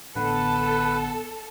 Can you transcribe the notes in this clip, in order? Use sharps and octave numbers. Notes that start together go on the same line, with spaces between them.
A1 D3 B3 A4 B4 F#5